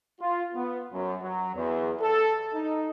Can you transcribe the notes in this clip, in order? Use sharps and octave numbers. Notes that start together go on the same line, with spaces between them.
F4
B3
F#2
F#3
E2
A4
D#4